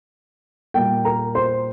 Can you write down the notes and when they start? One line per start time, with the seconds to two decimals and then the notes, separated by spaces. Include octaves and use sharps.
0.74 A#2 G3 A#3 G5
1.05 A#4 A#5
1.35 C5 C6